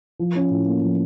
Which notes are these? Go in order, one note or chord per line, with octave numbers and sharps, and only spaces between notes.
F3
C#4
A2
A#3
F3